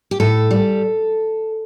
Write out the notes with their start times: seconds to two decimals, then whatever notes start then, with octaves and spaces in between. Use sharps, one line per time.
0.11 G4
0.20 A2 A4
0.51 G3